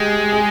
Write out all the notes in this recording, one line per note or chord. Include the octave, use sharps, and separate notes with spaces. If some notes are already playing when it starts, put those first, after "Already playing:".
Already playing: G#3 G4
G#4